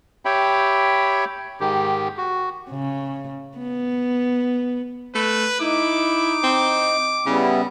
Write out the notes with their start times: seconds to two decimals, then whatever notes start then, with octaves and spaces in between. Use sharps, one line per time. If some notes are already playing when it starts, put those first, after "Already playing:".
0.25 G4 C#5 E5 G5 B5
1.60 G#2 D#3 G4
2.17 F#4
2.70 C#3
3.58 B3
5.15 A3 B4
5.60 D#4 E4 D6
6.43 C4
7.26 C#3 G3 B3 E4